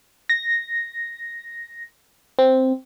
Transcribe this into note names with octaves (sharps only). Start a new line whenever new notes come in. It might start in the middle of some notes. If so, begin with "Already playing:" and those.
A#6
C4